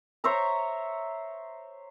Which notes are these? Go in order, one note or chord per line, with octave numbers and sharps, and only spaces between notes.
C5 C#5 E5 A#5